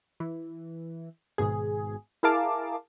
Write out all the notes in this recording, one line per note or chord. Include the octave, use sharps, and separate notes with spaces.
E3
G#1 G#2 B2 G#4
E4 G#4 A#4 F5 A5 D6